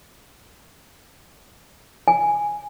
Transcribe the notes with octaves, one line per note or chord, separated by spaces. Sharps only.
G#5